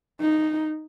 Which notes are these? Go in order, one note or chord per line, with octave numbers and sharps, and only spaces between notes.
D#4